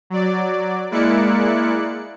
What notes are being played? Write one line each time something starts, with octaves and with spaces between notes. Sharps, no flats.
F#3 D5
G#3 A#3 E4 D5 F#6 C#7